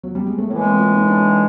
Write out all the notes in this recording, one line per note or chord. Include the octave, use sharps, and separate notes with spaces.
F#3
G3
G#3
A3
A2 E3 G#3 A#3
C4
F4
D#4
D4